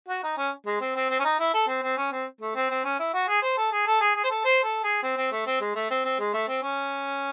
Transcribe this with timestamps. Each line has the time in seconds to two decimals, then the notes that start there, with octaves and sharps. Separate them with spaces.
0.08 F#4
0.23 D#4
0.37 C#4
0.66 G#3
0.81 C4
0.96 C4
1.10 C4
1.20 C#4
1.24 D#4
1.39 E4
1.54 A4
1.68 C4
1.83 C4
1.97 C#4
2.12 C4
2.41 A3
2.55 C4
2.70 C4
2.84 C#4
2.99 E4
3.13 F#4
3.28 G#4
3.42 C5
3.57 A4
3.72 G#4
3.86 A4
4.01 G#4
4.15 G#4
4.24 C5
4.30 A4
4.45 C5
4.64 A4
4.84 G#4
5.03 C4
5.17 C4
5.32 A3
5.46 C4
5.61 G#3
5.75 A3
5.90 C4
6.04 C4
6.19 G#3
6.33 A3
6.48 C4
6.63 C#4